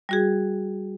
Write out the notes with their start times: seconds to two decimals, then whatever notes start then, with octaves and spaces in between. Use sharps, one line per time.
0.09 G3 F#4 G#4